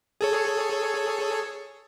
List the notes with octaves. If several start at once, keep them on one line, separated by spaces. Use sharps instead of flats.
G#4 A4 C#5